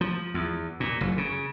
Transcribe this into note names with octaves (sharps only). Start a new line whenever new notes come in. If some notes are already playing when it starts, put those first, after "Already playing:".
F3
E2
A#2
F#1
C#3